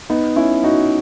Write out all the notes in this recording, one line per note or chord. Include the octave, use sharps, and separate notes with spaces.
B3 D#4
C#4 E4
D#4 F#4